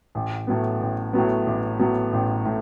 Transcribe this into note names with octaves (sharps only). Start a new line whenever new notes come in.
A1
A2 F#3 B3
A1
A2 F#3 B3
A1
A2 F#3 B3
A1
A2